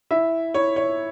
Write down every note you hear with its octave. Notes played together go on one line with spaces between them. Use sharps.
E4 E5
E4 C#5
C#5